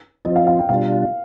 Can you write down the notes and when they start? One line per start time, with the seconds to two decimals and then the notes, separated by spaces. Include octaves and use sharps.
0.25 F3 C4 F4 D#5
0.36 F5
0.47 F5
0.59 G5
0.69 B2 G3 D4 F4 F5